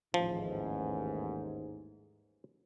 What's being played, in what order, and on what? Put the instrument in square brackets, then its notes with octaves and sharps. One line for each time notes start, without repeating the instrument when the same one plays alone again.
[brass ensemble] A1 D#2 G#2 [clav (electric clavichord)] F3